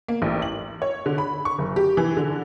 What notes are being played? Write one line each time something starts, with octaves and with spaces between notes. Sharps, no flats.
A#3
A1
F#7
C#5
D3
B5
C#6
F#1
G4
E3
D3